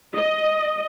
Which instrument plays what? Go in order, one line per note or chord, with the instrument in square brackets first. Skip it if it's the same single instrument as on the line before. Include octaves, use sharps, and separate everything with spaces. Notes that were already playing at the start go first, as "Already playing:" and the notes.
[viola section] D#5